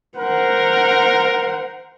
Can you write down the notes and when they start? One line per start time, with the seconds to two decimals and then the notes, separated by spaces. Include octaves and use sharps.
0.18 A#4 C5 F#5